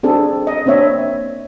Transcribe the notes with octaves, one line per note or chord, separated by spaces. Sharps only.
C4 D4 G#4 A4
D#5
A#3 C4 D4 C#5 E5